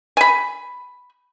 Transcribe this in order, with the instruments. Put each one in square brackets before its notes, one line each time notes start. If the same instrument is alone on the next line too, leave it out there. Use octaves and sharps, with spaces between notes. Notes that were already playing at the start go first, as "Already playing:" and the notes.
[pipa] G#5 B5